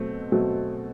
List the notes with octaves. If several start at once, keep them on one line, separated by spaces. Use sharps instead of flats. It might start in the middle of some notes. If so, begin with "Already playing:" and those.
Already playing: B2 F#3 A3 C4
B2 F#3 A3 C4